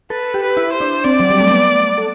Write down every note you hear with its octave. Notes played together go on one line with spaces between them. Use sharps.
A4 B4
G4
B4
E4
C5
D4
C4 D5
F#3
G3
A3
B3
A4